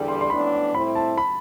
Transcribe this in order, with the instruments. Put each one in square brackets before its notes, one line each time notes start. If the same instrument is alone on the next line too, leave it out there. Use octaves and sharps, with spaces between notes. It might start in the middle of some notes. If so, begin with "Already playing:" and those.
Already playing: [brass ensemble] E2 D3 G3
[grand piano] C6
C6
[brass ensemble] A1 A2 E3 B3 D4 [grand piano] B5
[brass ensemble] A2 G3 C4 E4 [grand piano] B5
[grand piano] A5
B5